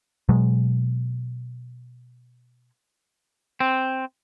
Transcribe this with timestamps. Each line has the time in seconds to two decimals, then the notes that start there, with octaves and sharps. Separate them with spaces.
0.29 B2 F#3 G#3
3.60 C4